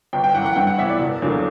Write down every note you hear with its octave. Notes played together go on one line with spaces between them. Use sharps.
G1 G5
G5
F#2 E3 F#5
F#5
G2 G5
F#5
E3 B3 E4 E5
D5
E1
E2 D3 F#3 A#3